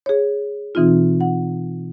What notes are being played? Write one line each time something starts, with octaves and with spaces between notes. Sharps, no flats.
G#4 C#5
B2 E3 C4 D#4 F4
F#5